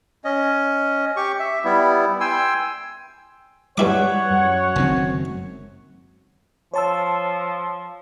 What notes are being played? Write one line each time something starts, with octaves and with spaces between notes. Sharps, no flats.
C#4 D#5
G4 C#6
E5
G3 B3 E4
G5 G#5 C6 E6
G2 G3 E4 C#5 F#5 D6
F#2
F#1 D#3 C4
F3 C#5 A5 E6